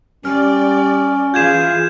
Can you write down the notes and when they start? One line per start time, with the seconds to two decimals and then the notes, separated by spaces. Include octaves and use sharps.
0.25 G3 C#4 D5 F6
1.34 E3 F4 G#4 G6 G#6 E7